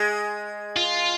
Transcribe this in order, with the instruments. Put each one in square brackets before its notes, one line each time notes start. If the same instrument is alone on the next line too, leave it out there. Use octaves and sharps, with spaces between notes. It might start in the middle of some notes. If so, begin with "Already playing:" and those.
Already playing: [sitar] G#3
[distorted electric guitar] F4